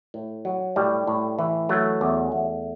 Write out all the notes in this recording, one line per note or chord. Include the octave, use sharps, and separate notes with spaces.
A2
F#3
A2 G3
A2
E3
F#3 A3
E2
E2